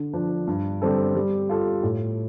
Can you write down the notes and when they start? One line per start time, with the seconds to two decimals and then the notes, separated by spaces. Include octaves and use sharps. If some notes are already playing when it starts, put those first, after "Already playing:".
Already playing: D3
0.13 F3 D4
0.47 G2
0.82 D3 G3 C4 A4
1.15 G3
1.49 F4 A4
1.83 A2